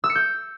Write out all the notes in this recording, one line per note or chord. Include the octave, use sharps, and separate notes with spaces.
E6
C#7
G6